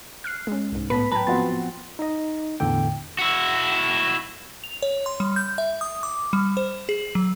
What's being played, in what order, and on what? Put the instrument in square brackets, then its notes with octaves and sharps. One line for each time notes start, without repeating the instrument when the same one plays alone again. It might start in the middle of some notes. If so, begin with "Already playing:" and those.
[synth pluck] F6 F#6 C7
G#3 C#4
C2 G#2
[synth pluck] A2 A5 B6 [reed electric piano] B3 [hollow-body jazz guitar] B4
[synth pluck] F#3 G5 [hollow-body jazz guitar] B4 [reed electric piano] A5 A#5
[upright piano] F3 C4 F#4 [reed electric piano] B3 C6 A6
[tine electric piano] D#4 D#5
E2 A2 D3 G5
[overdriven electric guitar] E4 F#4
[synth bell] F7
C#5
C6
G3
G6
E5
D#6
D6
G3
C5
G#4
F#3